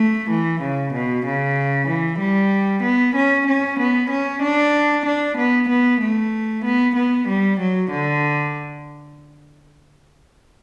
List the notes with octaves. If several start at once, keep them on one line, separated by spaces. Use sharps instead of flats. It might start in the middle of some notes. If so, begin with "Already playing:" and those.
Already playing: A3
E3
C#3
B2
C#3
E3
G3
B3
C#4
C#4
B3
C#4
D4
D4
B3
B3
A3
B3
B3
G3
F#3
D3